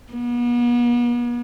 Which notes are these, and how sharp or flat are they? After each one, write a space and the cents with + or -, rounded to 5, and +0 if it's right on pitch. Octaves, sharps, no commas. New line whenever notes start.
B3 -40